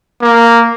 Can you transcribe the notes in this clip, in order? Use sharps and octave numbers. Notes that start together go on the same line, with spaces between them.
A#3